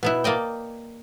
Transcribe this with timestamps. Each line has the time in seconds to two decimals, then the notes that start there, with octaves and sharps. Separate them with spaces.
0.03 B2 B3 E4
0.24 A#3 D5 D#5 G5